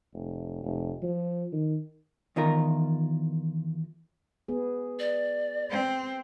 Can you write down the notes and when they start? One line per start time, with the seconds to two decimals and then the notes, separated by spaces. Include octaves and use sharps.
0.14 F1
0.63 F1
1.03 F3
1.52 D#3
2.36 E2 D#3 F4 A#4
4.48 B3 G#4
4.99 D5
5.71 C4